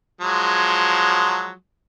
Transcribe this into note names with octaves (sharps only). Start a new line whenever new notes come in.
F3 F#3 G#3